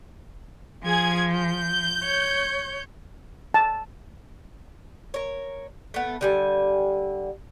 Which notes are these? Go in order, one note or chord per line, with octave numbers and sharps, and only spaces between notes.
F3 G#4 G#6
G6
C#5
A5
A#4 C#5
A3 B3
D3 G3 G#5